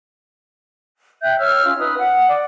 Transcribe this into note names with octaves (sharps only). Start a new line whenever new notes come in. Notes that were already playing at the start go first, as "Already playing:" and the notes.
E5 G5 F#6 G6
C#5 E6 F6
C#4 F4
D#4 B4 D#6
F#5
D5